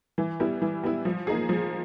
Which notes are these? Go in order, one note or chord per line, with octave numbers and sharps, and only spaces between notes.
E3
G3 B3 E4
E3
G3 B3 E4
F3
A#3 D#4 G#4
F3